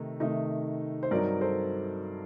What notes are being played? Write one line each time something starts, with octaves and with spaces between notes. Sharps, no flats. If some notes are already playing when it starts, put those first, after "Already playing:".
Already playing: C3 D#3 A3 D#4
C3 D#3 A3 D#4
C5
G2 F#3 C4 D#4 A#4 D5
A4 C5